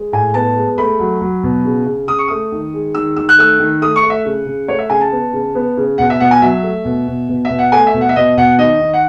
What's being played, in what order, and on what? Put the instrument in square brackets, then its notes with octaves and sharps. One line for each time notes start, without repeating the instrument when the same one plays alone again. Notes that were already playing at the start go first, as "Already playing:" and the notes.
Already playing: [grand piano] G#3
A2 G#5
B3 A5
G#3
A3 B5
F#3
F#3
B2
C#3
C#3
C#3 D#6
C#6
A3 D#6
D#3
G#3
D#3 E6
D#3 E6
F#6
A3 E6
D#3
A3 D#6
C#6
A3
E5
C#3
C#3
A3 C#5
E5
C#3 G#5
A5
B3
C#3
B3
C#3
B2 F#5
E5
B2 F#5
G#5
F#3 E5
A3
B2
B2
B2
E5
B2
F#5
A3 G#5
E5
B2
F#5
E5
B2 D#5
B2 F#5
D#3 D#5
D#3
F#5